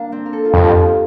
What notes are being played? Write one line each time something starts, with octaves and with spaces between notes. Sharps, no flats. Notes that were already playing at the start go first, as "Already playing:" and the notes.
Already playing: A#3 D4
C4
A#4
A4
F4
F2 G4
F4